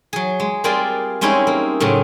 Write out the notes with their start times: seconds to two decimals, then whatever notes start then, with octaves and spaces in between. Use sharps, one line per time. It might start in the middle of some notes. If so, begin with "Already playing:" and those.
0.13 F#3 G#4
0.40 G#3
0.64 G3 A#3 C4 F4 G#4 D5
1.21 G3 G#3 C4 C#4 D#4 E4
1.47 A#3
1.80 A2 C#3 F#3 C4 C#4